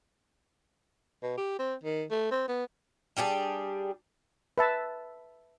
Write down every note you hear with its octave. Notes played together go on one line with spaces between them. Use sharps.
B2
G4
C4
D#3
A3
C4
B3
G3 D4 G4 G#4
B4 E5 A5